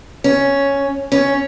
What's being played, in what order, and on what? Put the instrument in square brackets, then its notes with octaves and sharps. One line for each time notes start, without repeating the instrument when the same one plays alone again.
[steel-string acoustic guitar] C#4
C#4